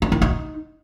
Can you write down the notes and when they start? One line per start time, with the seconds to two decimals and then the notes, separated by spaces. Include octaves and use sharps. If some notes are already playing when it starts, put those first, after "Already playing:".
0.02 D4
0.12 E4
0.22 D#4